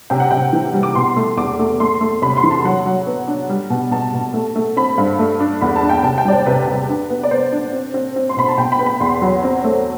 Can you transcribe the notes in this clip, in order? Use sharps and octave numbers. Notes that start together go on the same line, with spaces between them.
C3 G5
F#5
C3 G5
E3
G3
D6
B2 C6
A3
E2 D6
A3
A3 C6
A3
C3 B5
C6
E3
A5
F#3 F#5
F#3
B3
D4
G3
B2
B2 A5
B2
A3
A3
C4 B5
G2
A3
D4
E2 B5
A5
D4
G5
C3 A5
G5
G3 D5
C5
C3 B4
C3
D4
B3
D5
B3 C5
D4
C4
C4
C4
C6
B2 B5
A5
B2 G5
B5
B3
B5
E2 C6
F#3
C4
A3